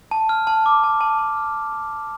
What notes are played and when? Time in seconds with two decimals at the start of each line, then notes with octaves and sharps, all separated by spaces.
0.11 A5
0.29 F6
0.47 A5
0.66 D6
0.84 A5
1.01 A5
1.19 A5
1.37 F6